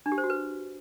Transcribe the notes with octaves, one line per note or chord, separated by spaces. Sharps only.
D4
G4
C5
F#4
B4